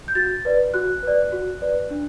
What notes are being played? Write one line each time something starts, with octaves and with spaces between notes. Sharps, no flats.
G6
F#4 A6
B4 D5
F#4 F#6
B4 D5
F#4
B4 D5
D4